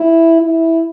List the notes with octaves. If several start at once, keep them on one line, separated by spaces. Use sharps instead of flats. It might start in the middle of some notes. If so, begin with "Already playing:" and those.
Already playing: E4
E4